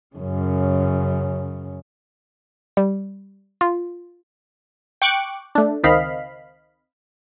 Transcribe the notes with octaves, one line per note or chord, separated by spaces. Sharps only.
F#2 C#3
G3
F4
G5 C#6 D6 F#6
A3 D4
C#2 D#3 C4 D#5 F5 B5